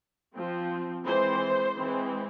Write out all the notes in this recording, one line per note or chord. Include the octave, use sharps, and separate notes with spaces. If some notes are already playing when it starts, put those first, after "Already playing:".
F3 C4
E3 G#3 C4 C5
E3 G#3 C4